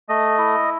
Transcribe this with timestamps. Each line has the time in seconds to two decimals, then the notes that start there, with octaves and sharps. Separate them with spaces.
0.09 A3 D#5
0.38 E4